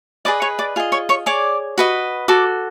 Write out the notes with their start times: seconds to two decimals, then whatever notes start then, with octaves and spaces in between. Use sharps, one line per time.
0.25 G#4 B4 D5 D#5 D6
0.42 C#5 C#6
0.59 D5 D6
0.76 F4 G#4 D#5
0.92 C#5 C#6
1.09 C#5 C#6
1.26 G#4 C#5 D5 D6
1.78 F#4 B4 D#5
2.28 F#4 A4 D6